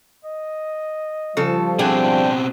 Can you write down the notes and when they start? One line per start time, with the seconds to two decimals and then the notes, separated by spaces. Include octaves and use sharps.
0.25 D#5
1.37 C#3 F3 G3 A4
1.79 B2 C4 D4 G#4 G5